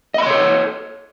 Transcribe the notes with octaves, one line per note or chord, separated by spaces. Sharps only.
A4 C#5 D#5 B5 C6